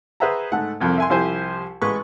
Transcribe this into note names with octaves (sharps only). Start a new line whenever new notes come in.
G#4 B4 C5 E5 F#5 A#5
G#2 A3 F#5
C2 F2 F3
E5 G#5 C6
C2 F3 E4 G4 C5 G#5
A1 G#3 B4 C#6